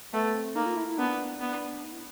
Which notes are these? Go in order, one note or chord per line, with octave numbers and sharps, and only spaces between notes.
A3 B3
C4
A#3 D#4
F4
E4
E4
B3 D4
B3
D#4
E4